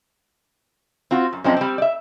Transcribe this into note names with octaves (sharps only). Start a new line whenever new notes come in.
C4 F4 F#4
F#2
F#2 F3 G#3 C4 D4
G3 C4
D5 E5